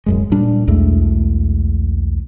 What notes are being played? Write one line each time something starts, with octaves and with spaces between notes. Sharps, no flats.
D1 F#2 G#3
A#2 G3 D4
B1 E2 G#3 A3